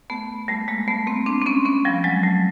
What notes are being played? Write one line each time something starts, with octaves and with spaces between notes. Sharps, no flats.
A3 B3
G3 A3
G#3 A#3
A3 B3
A#3 C4
C4 D4
C4
B3 C#4
B3 C#4
F3 G3
F#3 G#3
G3 A3